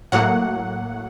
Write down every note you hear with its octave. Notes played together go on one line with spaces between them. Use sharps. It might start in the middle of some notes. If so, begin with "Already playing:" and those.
A2 F#3 A#3 F#5